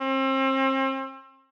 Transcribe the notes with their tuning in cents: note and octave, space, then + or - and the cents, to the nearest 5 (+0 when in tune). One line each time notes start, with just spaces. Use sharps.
C4 +35